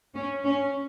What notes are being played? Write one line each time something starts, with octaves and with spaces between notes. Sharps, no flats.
C#4
C#4